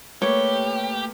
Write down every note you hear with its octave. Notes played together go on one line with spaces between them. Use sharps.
A3 A#3 G4 B4 C#5